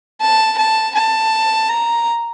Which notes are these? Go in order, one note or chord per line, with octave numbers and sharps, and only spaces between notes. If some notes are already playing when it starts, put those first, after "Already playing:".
A5
A5
A5
A#5